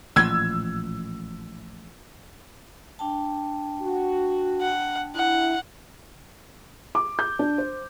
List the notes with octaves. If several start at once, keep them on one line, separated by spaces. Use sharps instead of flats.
A1 A#2 F3 E6 G#6
D4 G5 A5
F#4
F#5
E4 F#5
D6
G6
D4
C5